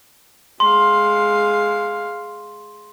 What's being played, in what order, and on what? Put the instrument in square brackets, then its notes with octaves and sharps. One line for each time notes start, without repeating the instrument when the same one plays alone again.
[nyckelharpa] G#3 F5 [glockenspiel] C6